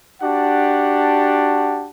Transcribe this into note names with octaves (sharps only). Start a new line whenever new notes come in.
D4 F#4 G4 F#5 A5